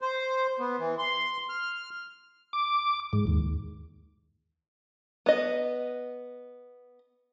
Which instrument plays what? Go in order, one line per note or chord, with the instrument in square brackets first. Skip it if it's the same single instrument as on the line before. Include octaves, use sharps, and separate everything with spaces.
[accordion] C5
B3
E3
C6
F6
[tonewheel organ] D6
G#2
D#2
[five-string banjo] B3 D#5